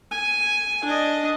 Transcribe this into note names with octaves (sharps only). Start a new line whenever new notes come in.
G#5
D4 D#5